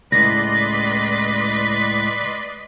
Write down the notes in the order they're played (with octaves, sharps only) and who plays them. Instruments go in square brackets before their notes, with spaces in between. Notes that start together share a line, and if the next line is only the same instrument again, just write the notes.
[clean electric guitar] C#2 A2 [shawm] B4 [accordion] D5 D#5 C6 [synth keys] A#6